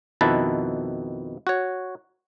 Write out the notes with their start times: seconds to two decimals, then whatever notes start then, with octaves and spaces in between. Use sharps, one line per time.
0.21 F2 B2 D#3 E4 B4 A5
1.47 F#4 C#5